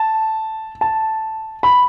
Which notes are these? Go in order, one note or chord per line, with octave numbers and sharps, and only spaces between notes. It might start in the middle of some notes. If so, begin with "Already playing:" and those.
Already playing: A5
A5
B5